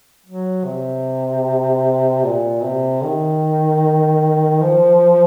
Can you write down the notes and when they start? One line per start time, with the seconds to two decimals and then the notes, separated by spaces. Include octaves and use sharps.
0.26 F#3
0.65 C3
2.24 A#2
2.63 C3
3.04 D#3
4.61 F3